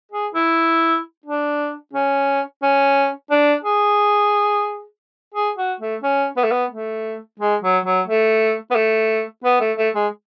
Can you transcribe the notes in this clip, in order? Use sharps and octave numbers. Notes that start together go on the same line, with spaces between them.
G#4
E4
D4
C#4
C#4
D4
G#4
G#4
F#4
A3
C#4
B3
A3
B3
A3
G#3
F#3
F#3
A3
B3
A3
B3
A3
A3
G#3